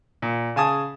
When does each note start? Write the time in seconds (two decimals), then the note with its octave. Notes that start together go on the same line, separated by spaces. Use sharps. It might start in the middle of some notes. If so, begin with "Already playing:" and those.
0.22 A#2
0.56 C#3 G#5 A5 D#6